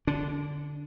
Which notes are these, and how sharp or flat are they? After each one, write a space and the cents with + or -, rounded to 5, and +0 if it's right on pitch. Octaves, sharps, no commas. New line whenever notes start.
D3 +0 D4 -25